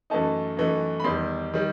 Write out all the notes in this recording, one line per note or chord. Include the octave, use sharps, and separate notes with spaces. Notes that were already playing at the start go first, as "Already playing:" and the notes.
F#2 E3 A3 D#4 A5
F#2 E3 A3 D#4
B5
E2 D#3 G3 C6
D#3 G3